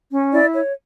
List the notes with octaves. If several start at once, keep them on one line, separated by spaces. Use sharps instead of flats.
C#4
E4 D5
C#5